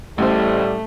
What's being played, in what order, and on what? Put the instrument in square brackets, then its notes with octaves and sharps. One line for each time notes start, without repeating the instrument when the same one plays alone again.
[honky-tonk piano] A1 C5 [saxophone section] A2 G3 [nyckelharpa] A3